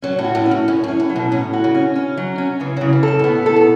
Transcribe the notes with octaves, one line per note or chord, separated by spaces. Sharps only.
F#3 C#4
A2
F#4
A2
C#4
F#2
A2 C#4
F#2 C#4
A2
F#3
B2
A2 C#4
F#4
C#3
C#4
C#4
F#3
C#4
C#3 E3
C#3 F#3
E3
F#2 A4
B2
A2 B3
A4
B2